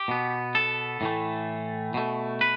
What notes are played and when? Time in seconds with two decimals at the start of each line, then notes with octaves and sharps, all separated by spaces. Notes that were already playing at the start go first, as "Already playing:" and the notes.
Already playing: G4
0.08 B2 B3
0.55 A4
1.01 A2 E3 A3
1.94 B2 A3
2.41 B4